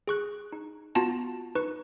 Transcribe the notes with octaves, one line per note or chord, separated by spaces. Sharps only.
G#4 C#6 F#6
D#4
B3 F4 F#4 A5 A#5
D#4 B4 C#6